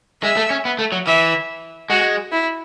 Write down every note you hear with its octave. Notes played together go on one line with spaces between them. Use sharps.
G#3 E5
A3
C#4
B3
A3
F#3
E3 E5
G#3 F#4
E4